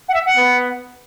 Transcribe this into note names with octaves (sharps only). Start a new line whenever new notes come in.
F#5
E5
F#5
B3